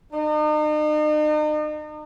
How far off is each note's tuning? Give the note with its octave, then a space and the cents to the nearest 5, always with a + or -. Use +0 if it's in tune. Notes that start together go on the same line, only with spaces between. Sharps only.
D#4 -40